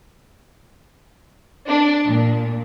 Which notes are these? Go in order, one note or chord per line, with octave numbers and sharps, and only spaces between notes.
D4
A#2